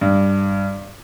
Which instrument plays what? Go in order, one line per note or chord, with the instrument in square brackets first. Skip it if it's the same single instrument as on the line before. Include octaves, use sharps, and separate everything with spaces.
[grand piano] G2